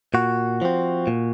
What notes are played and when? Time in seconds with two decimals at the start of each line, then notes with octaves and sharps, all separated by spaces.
0.14 A#2 F#4
0.62 F3 C4
1.07 A#2